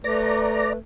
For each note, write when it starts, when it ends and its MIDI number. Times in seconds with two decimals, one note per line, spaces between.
0.04 0.79 57
0.04 0.77 71
0.04 0.73 74
0.04 0.73 82